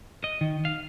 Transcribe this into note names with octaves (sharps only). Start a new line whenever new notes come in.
D#5
D#3
F5